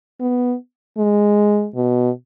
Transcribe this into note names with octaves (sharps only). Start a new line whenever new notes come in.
B3
G#3
B2